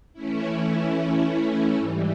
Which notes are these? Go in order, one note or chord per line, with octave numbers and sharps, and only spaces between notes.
E3 A3 C#4 E4
G#2 E3 G3